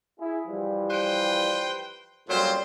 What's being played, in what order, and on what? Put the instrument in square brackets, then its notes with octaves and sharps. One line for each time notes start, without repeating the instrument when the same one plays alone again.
[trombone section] E4 G#4
E3 F3 G3
[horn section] B4 C5 G5
[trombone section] F2 G3 C#4 [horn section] A#2 F#3 C5